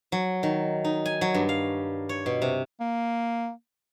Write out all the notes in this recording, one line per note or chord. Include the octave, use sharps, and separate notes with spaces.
F#3
D#3
D#4
G#5
F#3
G2
F5
C#5
B2
C3
A#3